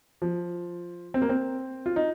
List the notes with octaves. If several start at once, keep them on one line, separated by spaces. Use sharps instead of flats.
F3
C4
A#3
C4
F4
D#4